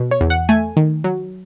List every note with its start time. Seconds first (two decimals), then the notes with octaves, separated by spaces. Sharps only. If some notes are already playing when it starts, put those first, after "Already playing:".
Already playing: B2
0.11 C#5
0.21 E2
0.30 F#5
0.49 A3 G#5
0.77 D#3
1.04 F#3